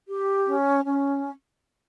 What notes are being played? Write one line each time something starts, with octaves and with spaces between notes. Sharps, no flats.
G4
C#4
C#4